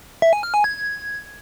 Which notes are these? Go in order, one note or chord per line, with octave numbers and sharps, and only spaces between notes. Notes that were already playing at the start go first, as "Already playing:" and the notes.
E5
G#5
F6
G#5
G#6